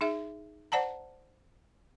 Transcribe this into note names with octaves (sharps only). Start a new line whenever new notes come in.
D#4 G#4 E5
C5 D5 F#5 A5 A#5